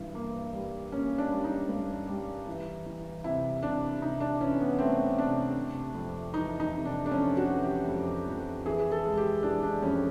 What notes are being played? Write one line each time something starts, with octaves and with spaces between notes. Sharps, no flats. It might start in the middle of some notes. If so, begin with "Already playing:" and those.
Already playing: G2 E3
A#3
G3
A#3 C#4
D4
G3
D#4
G2
G3
E3
E3
C3 E4
C3 D4
C3 D#4
D4
E3 C#4
B3
A3 C4
C3 D4
C3
F2
E3 D#4
D#4
C3
D4
D4
F2 C#4
F#4
E3
G4
F2
F2
E3 G#4
A4
G#3
G4
E3 D4
D4
F2 C#4